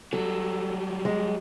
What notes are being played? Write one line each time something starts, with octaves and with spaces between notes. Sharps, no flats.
F#3 G3 A4
G#3